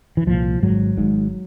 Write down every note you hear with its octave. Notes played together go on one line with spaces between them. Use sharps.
E3
C2 A#2 F3
G#1 G#2 F#3
G#1 G#2